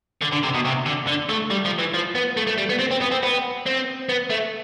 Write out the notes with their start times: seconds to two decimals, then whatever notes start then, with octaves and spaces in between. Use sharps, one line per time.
0.21 D3
0.32 D3
0.43 C3
0.54 B2
0.65 C3
0.86 D3
1.07 D3
1.30 A3
1.51 G3
1.65 F3
1.79 E3
1.94 F3
2.15 B3
2.37 A3
2.47 A3
2.58 G3
2.69 B3
2.79 C4
2.91 C4
3.01 B3
3.11 C4
3.23 B3
3.66 C4
4.09 B3
4.30 A3